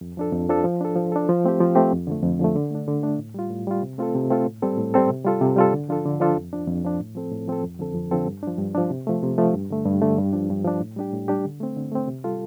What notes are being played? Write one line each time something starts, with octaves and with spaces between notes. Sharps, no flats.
F2
F3 D4 A4
F2
F3 D4 A4
F3
D4 A4
F3
D4 A4
F3
A3 C4 G4
F3
A3 C4 G4
F2
D3 F3 A3
F2
D3 F3 A3
D3
A3 D4
D3
A3 D4
A2
G3 F4
A2
G3 F4
C3
A3 C4 F4 A4
C3
A3 C4 F4 A4
A2
G3 C4 A4
A2
G3 C4 A4
C3
G3 F4 A4
C3
G3 F4 A4
D3
F3 D4 F4 A4
D3
F3 D4 F4 A4
F2
F3 D4
F2
F3 D4
A2
F3 C4 A4
A2
F3 C4 A4
F2
D3 F3 C4 A4
F2
D3 F3 C4 A4
G2
F3 D4
G2
F3 D4
C3
F3 A3
C3
F3 A3
G2
D3 A3
G2
D3 A3
G2
F3 D4
G2
F3 D4
A2
G3 D4 G4
A2
G3 D4 G4
D3
A3 C4
D3
A3 C4
C3
G3 F4 A4